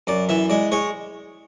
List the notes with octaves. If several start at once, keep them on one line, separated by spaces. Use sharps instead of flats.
F#2 D5
E3 E5
G#3 D5
G#3 C#5